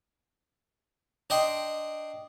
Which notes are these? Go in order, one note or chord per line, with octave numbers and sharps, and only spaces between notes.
D4 D#5 G5 C6